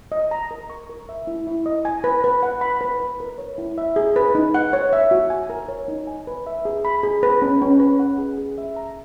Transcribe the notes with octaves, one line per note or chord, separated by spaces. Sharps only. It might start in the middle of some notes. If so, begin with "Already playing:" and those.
D#5
A#5
A#4
C#6
A#4
E5
E4
E4
D#5
G#5
B4
B4
F#5
B5
B4
B4
A#4
C#5
E4
E5
G#4
B4
D#4
F#5
C#5
E5
F#4
G#5
A#4
C#5
D#4
G#5
B4
E5
G#4
B5
G#4
B4
C#4
C#4
B4
F#5
G#4
G#4
E5
A#5